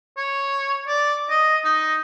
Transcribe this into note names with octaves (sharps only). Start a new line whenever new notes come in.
C#5
D5
D#5
D#4